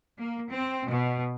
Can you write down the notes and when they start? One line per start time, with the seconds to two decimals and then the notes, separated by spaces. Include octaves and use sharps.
0.19 A#3
0.51 C4
0.89 B2